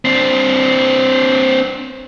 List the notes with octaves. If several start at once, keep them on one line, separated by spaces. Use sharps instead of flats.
C4 D4